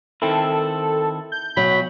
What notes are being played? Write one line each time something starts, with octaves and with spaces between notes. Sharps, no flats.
D#3 C4 E4 A4
G6
B1 F#3 B5